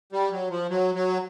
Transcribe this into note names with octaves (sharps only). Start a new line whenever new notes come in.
G3
F#3
F3
F#3
F#3